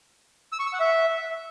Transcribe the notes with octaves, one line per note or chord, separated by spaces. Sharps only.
E6
C#6
E6
F#5
E5